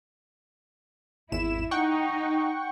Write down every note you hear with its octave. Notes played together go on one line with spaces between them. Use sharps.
G#1 E2 E4 E7
D#4 F#5 G5 C#6